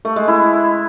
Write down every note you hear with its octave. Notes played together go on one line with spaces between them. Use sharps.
A3
G#3
E4